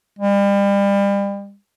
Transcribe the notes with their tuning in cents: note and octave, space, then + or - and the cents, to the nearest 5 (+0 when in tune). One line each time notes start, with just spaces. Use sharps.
G3 +35